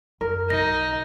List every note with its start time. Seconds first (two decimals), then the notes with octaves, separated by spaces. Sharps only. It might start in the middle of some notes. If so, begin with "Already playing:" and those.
0.21 F#2 A#4
0.50 B1 D#4 A#6